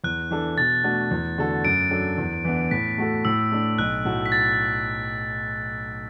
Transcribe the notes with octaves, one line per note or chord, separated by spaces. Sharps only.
E2 F#6
E3 D4 A4
B2 A6
A3 D4 F#4
E2
D3 A3 F#4 A4
F#2 D7
F#3 D4 A4
E2
E3 B3 D4
A2 B6
A3 F#4 A4
A2 E6
A3 D4
B1 F#6
A2 A3 F#4
B6
A6